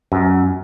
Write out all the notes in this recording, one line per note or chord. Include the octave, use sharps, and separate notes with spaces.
F#2